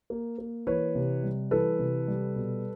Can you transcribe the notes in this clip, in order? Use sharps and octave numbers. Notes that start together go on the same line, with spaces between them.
A#3
A#3
E3 B4 C#5
C3
G3
E3 A4 B4
C3
G3
B2